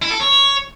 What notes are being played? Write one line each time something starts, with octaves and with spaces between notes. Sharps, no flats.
E4
A4
C#5